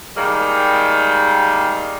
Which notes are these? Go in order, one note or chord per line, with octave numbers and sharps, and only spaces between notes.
D#3 G3 G#3 A#3